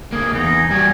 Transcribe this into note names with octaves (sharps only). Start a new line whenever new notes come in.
D3 A#3 G#4
E2 D#4
G3 F#4 G#5